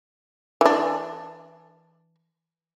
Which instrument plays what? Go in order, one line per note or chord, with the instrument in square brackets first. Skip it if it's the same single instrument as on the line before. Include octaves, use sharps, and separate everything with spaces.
[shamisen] E3 D4